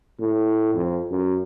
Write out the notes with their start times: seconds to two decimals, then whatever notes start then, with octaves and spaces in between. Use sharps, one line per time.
0.20 A2
0.75 F2
1.12 F#2